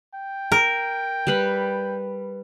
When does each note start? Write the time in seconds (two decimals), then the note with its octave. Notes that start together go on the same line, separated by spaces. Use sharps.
0.14 G5
0.52 A#4
1.27 G3 B4 B5